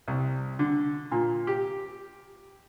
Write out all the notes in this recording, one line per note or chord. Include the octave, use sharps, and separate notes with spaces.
C2
D3
A#2
G4